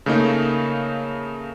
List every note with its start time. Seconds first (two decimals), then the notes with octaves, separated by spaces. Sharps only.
0.06 C#3 A3 A#3 D#4